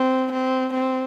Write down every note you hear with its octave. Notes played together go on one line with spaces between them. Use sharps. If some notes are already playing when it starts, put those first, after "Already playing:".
Already playing: C4
C4
C4